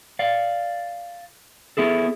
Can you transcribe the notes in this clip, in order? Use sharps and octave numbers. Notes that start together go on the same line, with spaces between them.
D5 F5
B3 E4 G#4 A4